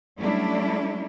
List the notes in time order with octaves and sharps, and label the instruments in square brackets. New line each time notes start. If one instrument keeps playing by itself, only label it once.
[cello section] F#3 G3 A3 C#4 D4 E4